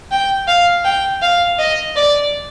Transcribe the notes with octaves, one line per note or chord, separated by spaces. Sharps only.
G5
F5
G5
F5
D#5
D5